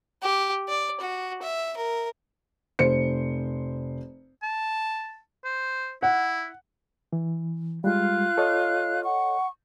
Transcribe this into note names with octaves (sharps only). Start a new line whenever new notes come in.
G4
D5
F#4
E5
A#4
F1 C5 C#7
A5
C5
E4 F#5
E3
G3 G#3 F4 F5 F#6
A4 C#5 D#5
F#5 C#6